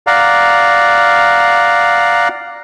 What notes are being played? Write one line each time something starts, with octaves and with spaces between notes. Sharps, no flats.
D5 F5 F#5 A#5